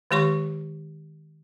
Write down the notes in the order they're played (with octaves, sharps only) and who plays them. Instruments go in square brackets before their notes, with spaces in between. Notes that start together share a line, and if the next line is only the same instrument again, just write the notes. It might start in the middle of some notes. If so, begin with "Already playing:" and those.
[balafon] D#3 G#3 G4 C#5 C6 C#6